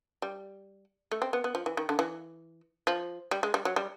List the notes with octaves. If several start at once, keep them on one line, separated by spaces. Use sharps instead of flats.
G3
A3
C4
B3
B3
F3
E3
D#3
D3
E3
F3
G3
G#3
G3
F#3
G3